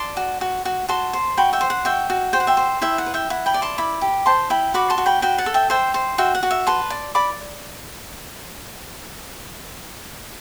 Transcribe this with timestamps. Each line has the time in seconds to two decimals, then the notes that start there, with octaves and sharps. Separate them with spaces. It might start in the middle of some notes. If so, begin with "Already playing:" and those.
Already playing: D5 A5 C6
0.17 F#4
0.41 F#4
0.65 F#4
0.88 F#4 A5 C6
1.13 C5
1.37 F#4 G5 B5
1.53 E5 G5
1.61 C5
1.70 F#5
1.85 F#4 E5 G5
2.10 F#4
2.33 C5 G5
2.40 F#5
2.47 E5 G5
2.57 C5
2.82 E4 E5 G5
2.98 F#5
3.06 B4
3.14 E5 G5
3.30 E4 F#5
3.46 G5 B5
3.54 D5
3.62 A5 C6
3.78 E4 B5 D6
4.01 G4
4.26 C5 A5 C6
4.50 E4 G5 B5
4.74 F#4 B5 D6
4.90 A5 C6
4.98 F#4
5.06 G5 B5
5.22 F#4 G5 B5
5.38 F#5 A5
5.46 A4
5.54 E5 G5
5.70 C5 E5 G5
5.94 C5
6.18 F#4 E5 G5
6.35 F#5
6.43 F#4
6.51 E5
6.67 B4 A5 C6
6.90 D5
7.15 D5 B5 D6